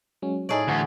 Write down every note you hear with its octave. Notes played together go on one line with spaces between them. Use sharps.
F#3 G#3 C#4
A2 D#4 G#4 A4 C#5 D5
D2 E3